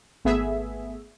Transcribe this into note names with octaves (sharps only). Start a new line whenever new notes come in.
G#1 A3 B3 G#4 E5